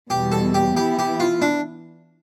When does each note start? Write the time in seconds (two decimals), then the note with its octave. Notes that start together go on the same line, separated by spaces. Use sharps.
0.10 E2 B2 G3 G4
0.32 A4
0.54 G4
0.76 E3 B3 E4 G4
0.99 G4
1.20 F4
1.42 D4